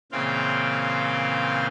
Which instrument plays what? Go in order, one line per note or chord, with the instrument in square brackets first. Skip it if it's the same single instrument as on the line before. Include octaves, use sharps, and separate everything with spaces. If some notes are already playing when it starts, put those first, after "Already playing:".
[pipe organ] A#2 C#3 E3 C4 F5 G5